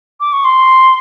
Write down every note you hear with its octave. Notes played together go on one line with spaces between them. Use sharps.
D6
C#6
C6